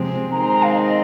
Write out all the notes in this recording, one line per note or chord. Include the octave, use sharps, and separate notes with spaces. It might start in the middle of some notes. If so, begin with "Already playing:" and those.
Already playing: C3 F3 G#3 C4
D#3 G#3 C4 A#5
A#5
A#5
F5
D#5